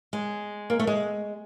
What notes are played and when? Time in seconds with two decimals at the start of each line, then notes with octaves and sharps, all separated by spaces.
0.13 G#3
0.70 A#3
0.79 A3
0.87 G#3